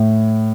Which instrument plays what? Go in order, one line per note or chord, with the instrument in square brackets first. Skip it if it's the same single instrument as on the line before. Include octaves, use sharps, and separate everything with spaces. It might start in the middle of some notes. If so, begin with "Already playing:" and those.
Already playing: [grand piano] A2